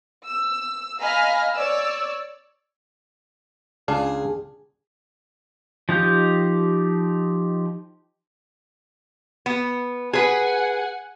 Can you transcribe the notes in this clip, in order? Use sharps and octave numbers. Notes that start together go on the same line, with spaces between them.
E6
D#5 F5 G#5 A#5 B5 F6
C#5 D5 E6
C#2 D4 G#4 F5
F3 D#4 G4 G6
B3
G#4 B4 F#5 G#5